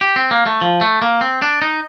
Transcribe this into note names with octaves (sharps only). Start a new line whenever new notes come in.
G4
C4
A#3
A3
F3
A3
A#3
C4
D4
D#4